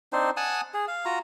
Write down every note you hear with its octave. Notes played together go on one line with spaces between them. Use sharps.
C4 D4 D#4 C5
F#5 G#5 A5 D#6
G#4
F5
F4 F#4 A#5